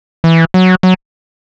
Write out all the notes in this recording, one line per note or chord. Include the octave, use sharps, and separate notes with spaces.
E3
F#3
F#3